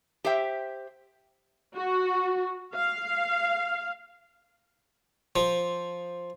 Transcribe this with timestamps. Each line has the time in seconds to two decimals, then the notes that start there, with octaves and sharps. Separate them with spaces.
0.24 G4 C5 E5 G5
1.75 F#4
2.75 F5
5.36 F3